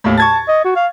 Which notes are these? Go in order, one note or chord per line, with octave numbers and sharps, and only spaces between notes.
D#2 A2
A5 C#6 G#6 A6
D#5
F#4
F5